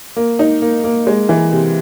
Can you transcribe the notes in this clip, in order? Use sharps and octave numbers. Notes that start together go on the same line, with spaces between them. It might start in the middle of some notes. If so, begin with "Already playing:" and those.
A#3
D#4
A#3
A#3
G#3
E3
C3